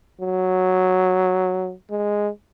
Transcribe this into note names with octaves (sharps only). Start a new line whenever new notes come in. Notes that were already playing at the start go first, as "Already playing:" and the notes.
F#3
G#3